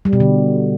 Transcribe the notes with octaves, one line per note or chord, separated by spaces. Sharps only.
G3
B2
D3